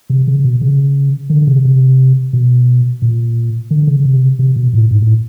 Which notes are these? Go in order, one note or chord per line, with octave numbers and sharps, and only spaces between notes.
C3
C#3
B2
C#3
D3
C3
C3
B2
A#2
D3
C#3
C3
C3
B2
A2
G#2
A2